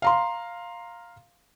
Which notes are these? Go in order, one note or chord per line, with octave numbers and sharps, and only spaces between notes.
F5 A#5 C6